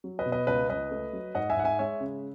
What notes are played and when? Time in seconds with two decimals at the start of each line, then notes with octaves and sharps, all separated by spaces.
0.04 F#3
0.19 B4 D#5
0.26 B2
0.32 B4 D#5
0.47 C#2 B4 D#5
0.69 C#2 B4 D#5
0.91 A3
1.13 F#3
1.35 G#2 D#5 F#5
1.50 E5 G#5
1.56 G#2 F#5
1.64 E5 G#5
1.79 G#3 C#5 E5
2.00 C#3